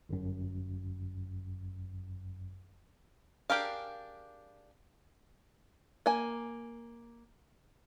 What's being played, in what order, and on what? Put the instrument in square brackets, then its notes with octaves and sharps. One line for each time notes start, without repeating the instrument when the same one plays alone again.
[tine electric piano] G1 F#2
[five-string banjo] D4 G4 G#4 A#4 F5
A#3 G#5